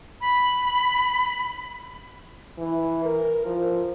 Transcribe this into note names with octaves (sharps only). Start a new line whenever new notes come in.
B5
E3
A#4
F3